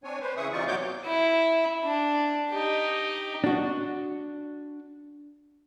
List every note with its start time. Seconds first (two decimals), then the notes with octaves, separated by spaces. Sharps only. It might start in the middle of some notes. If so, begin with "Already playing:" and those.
0.04 C4 D4 C#5 G#5
0.21 B4 C5
0.37 C#3 E3 G#4 E5 C#6 D#6
0.52 C3 E3 D#4 F4 D5 C#6
0.67 F#2 B3 F#4 C#5 D6 G6
1.05 E4
1.84 D4
2.51 D#4 G4
3.44 D4 F#4